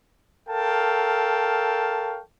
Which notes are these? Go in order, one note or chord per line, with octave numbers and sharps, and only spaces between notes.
A4 A#4 C#5 F5 G5 A5